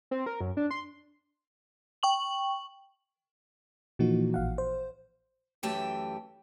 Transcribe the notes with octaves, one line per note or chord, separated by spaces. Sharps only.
C4
A#4
F#2
D4
C6
G5 C#6 F#7
A#2 E3 F3 A#3 D#4 F#4
A1 F5 F#5
C5
F#2 E3 A3 G4 G5 A5